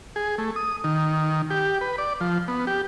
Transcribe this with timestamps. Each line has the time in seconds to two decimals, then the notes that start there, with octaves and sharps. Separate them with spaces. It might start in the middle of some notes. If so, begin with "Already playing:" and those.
0.16 G#4
0.38 A3
0.56 D#6
0.84 D#3
1.50 G4
1.81 B4
1.98 D5
2.21 F3
2.48 B3
2.67 G4